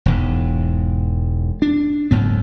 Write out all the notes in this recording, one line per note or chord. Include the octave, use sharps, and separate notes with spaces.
E1 E2 G#2
D4
F#1 D2 G#2 B3